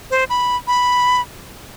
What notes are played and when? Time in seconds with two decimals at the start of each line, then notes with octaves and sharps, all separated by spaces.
0.11 C5
0.29 B5
0.67 B5